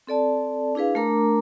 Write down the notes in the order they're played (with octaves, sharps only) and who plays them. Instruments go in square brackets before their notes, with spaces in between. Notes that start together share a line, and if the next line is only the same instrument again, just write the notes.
[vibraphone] C4 A4 D5 A5
D4 E4 G#4 B4 F5
A3 D4 A#4 A#5 D6